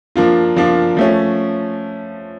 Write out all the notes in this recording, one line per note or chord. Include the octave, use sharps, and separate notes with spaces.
F3 A#3 D4 F4
F3 A#3 D4 F4
F3 A3 C#4